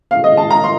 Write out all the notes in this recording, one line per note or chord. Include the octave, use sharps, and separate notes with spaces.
F5
D#5
A5
A#5
C6